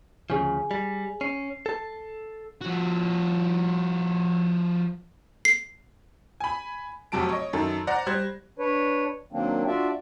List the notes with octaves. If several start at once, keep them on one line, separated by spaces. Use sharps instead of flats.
D2 C#3 F3 G#4 G#5
G3
C#4 C7
A4 A5
F3 F#4
C7
G#5 B5
F1 C3 F#3 A5 D7
C#5 D#5
F#2 D#3 A4
C5 D5 F#5 A#5 A#6
G3 C5 F#6 G#6
D4 B4 C#5
D#3 F#3 A#3 C4 D4
D4 F4 F#4 D5 E5